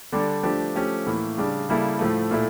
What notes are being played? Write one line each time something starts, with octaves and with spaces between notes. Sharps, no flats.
D3 G3 D4
F3 A3 D4 G4
F3 A3 C#4 G4
A2 E3 A#3
C#3 G3 D4
C#3 G3 A#3 E4 A4
A2 F3 A3
A#2 A3 E4